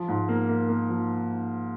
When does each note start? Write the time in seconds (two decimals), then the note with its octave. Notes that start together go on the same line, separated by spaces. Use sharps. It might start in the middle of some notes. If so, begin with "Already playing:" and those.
Already playing: F3
0.08 G#2
0.29 A#3
0.48 A#3
0.69 A#3
0.89 F3